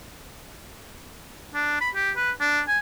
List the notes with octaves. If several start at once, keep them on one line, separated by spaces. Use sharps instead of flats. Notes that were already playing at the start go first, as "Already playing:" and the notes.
D4
B5
G4
B4
D4
G#5